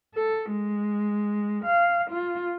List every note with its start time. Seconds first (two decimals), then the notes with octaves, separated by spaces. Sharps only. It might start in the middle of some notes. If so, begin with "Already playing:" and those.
0.15 A4
0.51 G#3
1.65 F5
2.11 F4